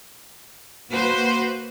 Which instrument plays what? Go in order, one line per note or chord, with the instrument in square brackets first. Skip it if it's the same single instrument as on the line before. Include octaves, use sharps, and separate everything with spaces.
[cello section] A#3 F#4 B4 C5